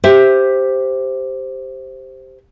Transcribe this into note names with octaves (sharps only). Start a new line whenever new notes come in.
G4 C5 E5